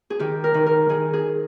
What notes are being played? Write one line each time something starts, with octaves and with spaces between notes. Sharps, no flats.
G#4
D#3 G4
A#4
D#3
A#4
D#3 G#4
G#4